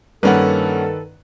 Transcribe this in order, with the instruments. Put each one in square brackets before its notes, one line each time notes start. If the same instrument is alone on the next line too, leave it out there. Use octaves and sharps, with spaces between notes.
[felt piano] G2 [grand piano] D#3 B4 [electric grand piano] A#3 C#4 F#5 [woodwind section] A4